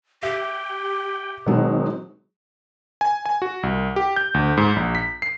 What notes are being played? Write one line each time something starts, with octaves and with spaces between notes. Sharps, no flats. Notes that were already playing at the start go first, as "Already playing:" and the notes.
G4 E5 G5
B2 D#3 F#3 G#3 C4 D#4
G#5
G#5
F#4
C2
G4
G6
D2
G#2
A#1
B6
C7